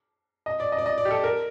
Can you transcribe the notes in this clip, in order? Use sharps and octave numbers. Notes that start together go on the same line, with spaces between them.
D#5
D5
D#5
D5
D#5
D5
G4
A4
A#4